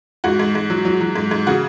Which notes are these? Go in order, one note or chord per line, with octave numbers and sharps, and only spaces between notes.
G#2 F#4
G#2
G#2
F#3
F#3
F#3
G#2
G#2
C#3 F#4